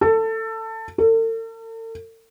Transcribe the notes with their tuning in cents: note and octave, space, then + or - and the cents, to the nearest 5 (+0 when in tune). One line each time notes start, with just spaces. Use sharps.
A4 +20
A4 +45